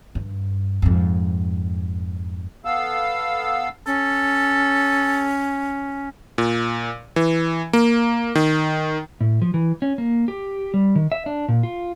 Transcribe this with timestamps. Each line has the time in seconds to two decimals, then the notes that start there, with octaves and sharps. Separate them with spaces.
0.15 G2
0.82 F2 G#2
2.65 B3 A4 F5 E6
3.86 C#4 A4
6.38 A#2
7.16 E3
7.73 A#3
8.35 D#3
9.21 A2
9.42 F3
9.54 E3
9.82 C#4
9.98 A#3
10.28 G4
10.74 G3
10.95 D#3
11.12 E5
11.26 D4
11.48 A#2
11.63 F4